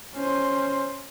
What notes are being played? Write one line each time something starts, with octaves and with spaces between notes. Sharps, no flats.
C#4 C5